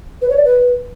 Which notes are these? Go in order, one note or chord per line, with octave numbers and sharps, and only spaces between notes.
B4
C#5
D5
B4